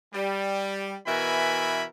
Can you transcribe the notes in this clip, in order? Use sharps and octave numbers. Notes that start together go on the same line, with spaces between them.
G3
B2 E3 A#4 E5 G#5 B5